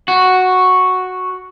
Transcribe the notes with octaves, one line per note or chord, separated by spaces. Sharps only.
F#4